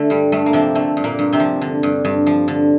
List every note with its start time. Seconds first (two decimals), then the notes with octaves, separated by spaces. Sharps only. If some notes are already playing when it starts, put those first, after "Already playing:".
Already playing: D3 A3
0.10 G2 G3
0.32 G2 A3
0.46 A#3
0.53 C3 F3 C4
0.75 D3 A3
0.97 G2
1.04 A#2 A#3
1.19 G2
1.33 C3 C4
1.40 F3
1.62 D3
1.83 G2
2.05 G2
2.27 F3
2.48 D3